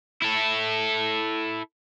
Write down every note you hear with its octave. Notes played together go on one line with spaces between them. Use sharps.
E4 A4